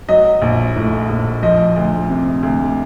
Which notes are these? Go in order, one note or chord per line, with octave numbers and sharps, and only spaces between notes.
F#3 D#5
A#1
A2
A#1
F3 D#5
D2
C3
D2